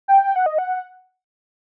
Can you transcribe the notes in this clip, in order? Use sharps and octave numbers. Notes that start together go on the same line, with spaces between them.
G5
G5
F#5
D#5
F#5